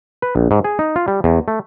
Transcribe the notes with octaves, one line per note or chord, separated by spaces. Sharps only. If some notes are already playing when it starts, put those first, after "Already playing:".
B4
A#1
G#2
G#4
D#4
F4
G3
E2
A3